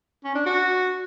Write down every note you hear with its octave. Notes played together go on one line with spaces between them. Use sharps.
C#4
D4
F#4